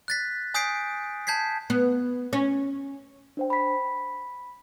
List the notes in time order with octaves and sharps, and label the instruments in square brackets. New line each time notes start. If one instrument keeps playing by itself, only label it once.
[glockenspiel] F#6 A6 B6
G#5 D#6 G6 B6 C7 D7
A5 G6 G#6 B6 C7
[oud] B3
C#4
[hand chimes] D4 C5 G5
B5 B6